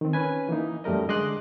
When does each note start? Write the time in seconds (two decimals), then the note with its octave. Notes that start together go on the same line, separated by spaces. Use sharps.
0.01 D#3 C4
0.13 C#4 B4 G#5
0.49 E3 A#3 D#4
0.84 F#2 G3 A3 A#4 D#5
1.08 D3 G#3 D#5 C6 D6 F#6